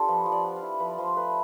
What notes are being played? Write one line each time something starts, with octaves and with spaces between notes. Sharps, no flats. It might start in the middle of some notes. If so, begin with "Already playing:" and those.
Already playing: D4 F4 G4 A4
F3 B4
F3
D5
B3
F5
E4
F3 B4
D5
F3 C5
A3 B4